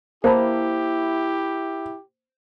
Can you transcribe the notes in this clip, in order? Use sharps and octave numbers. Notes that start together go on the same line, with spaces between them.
A#3 E4 G4 C5 A5 B5